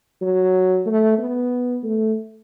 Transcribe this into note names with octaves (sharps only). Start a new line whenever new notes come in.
F#3
A3
B3
A3